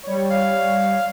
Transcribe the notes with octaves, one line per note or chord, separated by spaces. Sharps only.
G3 C#5
F5